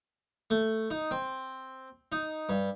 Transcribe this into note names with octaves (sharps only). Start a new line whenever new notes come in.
A3
D#4
C4
D#4
G2